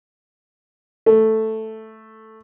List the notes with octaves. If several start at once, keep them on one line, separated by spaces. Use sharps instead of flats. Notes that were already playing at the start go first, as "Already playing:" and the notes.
A3